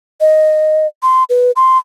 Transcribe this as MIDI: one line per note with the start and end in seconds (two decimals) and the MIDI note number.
0.21 0.87 75
1.03 1.24 84
1.30 1.51 71
1.56 1.78 84